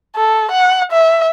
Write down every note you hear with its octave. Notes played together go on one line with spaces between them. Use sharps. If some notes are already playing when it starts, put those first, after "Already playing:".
A4
F#5
E5